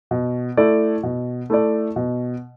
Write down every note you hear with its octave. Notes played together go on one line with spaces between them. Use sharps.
B2
A3 E4 A4 D5
B2
A3 E4 A4 D5
B2